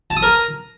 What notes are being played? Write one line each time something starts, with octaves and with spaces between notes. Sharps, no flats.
A5
D#6
A#4